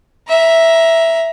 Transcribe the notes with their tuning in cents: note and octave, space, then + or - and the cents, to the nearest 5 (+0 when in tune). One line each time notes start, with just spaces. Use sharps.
E5 +0 A#5 +20